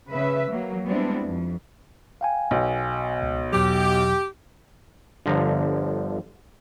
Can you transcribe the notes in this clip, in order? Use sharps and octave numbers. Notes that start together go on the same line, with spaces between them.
C#3 B4 E5
F#3 A#3
G3 G#3 B3 C4 D4 E4
F2
F5 G5 G#5
B1
C#2
E2 B2 F#3 G4
G1 D3 F3 A#5